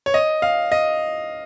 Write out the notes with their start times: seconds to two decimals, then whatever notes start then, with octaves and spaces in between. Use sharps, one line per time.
0.06 C#5
0.14 D#5
0.42 F5
0.72 D#5